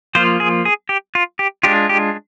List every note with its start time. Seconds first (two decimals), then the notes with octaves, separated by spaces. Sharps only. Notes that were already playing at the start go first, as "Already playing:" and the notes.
0.15 F3 A#3 F4 C5
0.40 G#4
0.65 G#4
0.89 G4
1.15 F4
1.39 G4
1.63 G#3 D4 F4 G4
1.89 G4